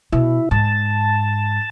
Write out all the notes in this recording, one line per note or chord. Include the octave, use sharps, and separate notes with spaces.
B2 E4
G#2 A5